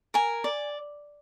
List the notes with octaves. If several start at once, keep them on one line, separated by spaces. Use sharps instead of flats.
A#4 G#5
D5